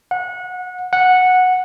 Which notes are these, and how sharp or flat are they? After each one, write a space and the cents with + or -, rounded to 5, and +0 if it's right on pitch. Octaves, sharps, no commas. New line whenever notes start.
F#5 -25
F#5 -10